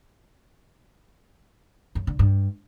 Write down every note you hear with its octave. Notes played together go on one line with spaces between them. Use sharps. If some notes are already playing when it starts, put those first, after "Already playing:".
F#2
D3
G2